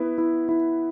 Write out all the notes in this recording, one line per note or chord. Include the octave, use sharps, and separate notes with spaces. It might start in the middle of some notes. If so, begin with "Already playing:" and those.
Already playing: B3 E4 B4
E4
E4